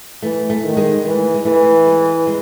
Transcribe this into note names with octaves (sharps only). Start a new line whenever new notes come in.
E3 A3
A3
D#3
G#3
E3 A3
G#3
E3 A3
G#3
G#3